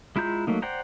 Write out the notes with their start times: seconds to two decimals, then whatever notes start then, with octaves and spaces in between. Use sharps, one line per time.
0.16 G#3 E4 F4 A#5 G6
0.47 F#3 A3 A#3 D#4
0.62 C5 D5 F#5 G5 A#5